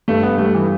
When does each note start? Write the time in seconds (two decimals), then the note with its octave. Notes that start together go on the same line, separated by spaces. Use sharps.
0.08 G2 A3
0.23 B3
0.38 G3 A3
0.55 E3